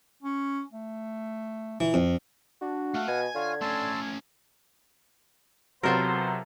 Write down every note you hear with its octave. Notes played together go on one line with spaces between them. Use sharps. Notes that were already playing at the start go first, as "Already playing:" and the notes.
C#4
A3
A#2 E3
F2
D4 F#4
A3 F5 F#5
B2 G#5 G#6
D3 F4 C#5 F5
A3 C#4 A5 C6 E6
C3 F#3 B3 F4 A4 A#4 C5